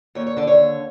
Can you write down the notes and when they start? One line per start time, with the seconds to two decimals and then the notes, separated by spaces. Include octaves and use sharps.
0.15 D#2 C#5
0.27 C#5
0.37 D3 D5
0.47 C#5
0.58 D#2